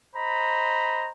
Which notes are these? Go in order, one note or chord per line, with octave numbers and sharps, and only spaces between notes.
C5 D#5 A#5 B5